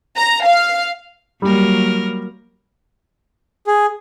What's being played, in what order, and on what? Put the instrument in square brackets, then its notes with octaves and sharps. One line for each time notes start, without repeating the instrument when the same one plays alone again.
[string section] A#5
F5
[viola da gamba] F#3 A#3 A#4 [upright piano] G3
[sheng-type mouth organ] G#4